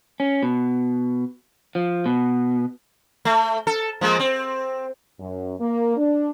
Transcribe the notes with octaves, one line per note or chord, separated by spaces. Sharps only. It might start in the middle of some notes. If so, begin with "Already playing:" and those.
C#4
B2
F3
B2
A3
A4
F3 G#3 A#3
C4
F#2
A#3
D4